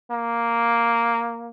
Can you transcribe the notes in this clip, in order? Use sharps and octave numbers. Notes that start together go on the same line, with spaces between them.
A#3